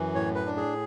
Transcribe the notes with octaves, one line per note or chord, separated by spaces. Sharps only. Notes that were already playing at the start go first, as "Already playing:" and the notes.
Already playing: F#2 E3
A2 C#5
B4
D4
G#4